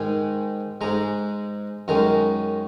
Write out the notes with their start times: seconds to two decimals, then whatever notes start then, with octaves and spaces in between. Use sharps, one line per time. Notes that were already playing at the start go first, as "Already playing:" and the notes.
Already playing: G#2 D#3 G#3 G#5
0.81 G#2 G#3 A#5
1.88 F#2 D#3 G#3 A#5